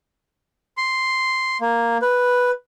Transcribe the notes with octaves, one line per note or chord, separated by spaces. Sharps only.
C6
A#3
B4